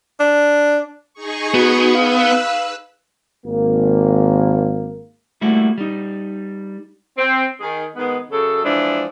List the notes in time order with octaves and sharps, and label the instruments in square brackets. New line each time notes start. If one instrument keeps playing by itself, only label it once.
[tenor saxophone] D4
[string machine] D#4 G#4 C#6
[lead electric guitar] B3 [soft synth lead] F#4
[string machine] B4 E6 F#6 [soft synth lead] F5
[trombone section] G#1 A#3
[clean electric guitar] G3 A3 A#3 E4 F#4
G3 D#4
[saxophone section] C4
D#3 G#4
D#3 G#3 B3
F#2 C#3 A4
E3 F3 G#3 D4